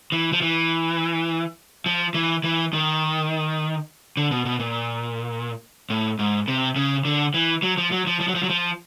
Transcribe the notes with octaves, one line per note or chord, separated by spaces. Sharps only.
E3
F3
E3
F3
E3
E3
D#3
D3
B2
B2
A#2
A2
G#2
C3
C#3
D3
E3
F#3
F3
F#3
F3
F3
F#3
F3
F#3
F3